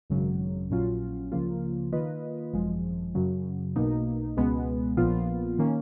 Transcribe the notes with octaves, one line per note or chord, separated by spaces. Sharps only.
G#1 F#2 C#3 F#3
A#1 A#2 F#3 C#4 F4
C#2 C#3 F3 A#3 F4
D#3 A#3 F4 B4 D#5
G#1 F#2 F3 G#3
F#2 C#3 F#3
B1 B2 A#3 D#4
C#2 B2 G#3 B3
A#1 A#2 F3 B3 F4
D#3 A#3 C#4